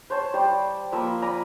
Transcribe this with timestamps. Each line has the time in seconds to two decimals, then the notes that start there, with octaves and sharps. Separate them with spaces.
0.10 C5 C#5 A5
0.34 G3 C5 D5
0.92 F3 A#3 B5 E6
1.22 D5 G#5 A#5 B5